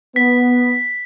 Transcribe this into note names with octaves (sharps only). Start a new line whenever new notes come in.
B3 B6